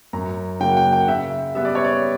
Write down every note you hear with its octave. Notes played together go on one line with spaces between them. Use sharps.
F#2 A#5
C#3 F#3 A#3 G5
F#5
G5
G5
F#5
C#3 E5
G3 B3 E5
D5
C#5
D5